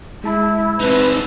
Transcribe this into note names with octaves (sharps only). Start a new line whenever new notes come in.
G#3 E4 A5 B5
C4 D#4 B4